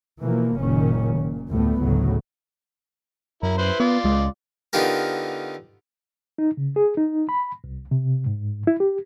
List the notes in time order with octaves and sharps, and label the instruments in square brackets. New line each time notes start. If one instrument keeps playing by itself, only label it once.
[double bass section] B2 E3 F3 A#3
F#1 A#2 D#3 C#4
A#2
F1 D2 A2 G3 A3 B3
A1 D2 A2 C#3 F#3
[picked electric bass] F#2 [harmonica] E4 A#4
[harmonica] E4 B4 C5
[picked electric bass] B3 [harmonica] F4 D5
[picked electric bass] C#2 G#3
[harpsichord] D3 B3 D#4 F4 G4 A#4
[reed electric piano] D#4
C#3
G#4
D#4
B5
C2
C3
G#2
E4
G4